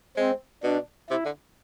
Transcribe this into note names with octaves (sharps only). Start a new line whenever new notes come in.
G#3 C4
B2 D4
C3 E4
D3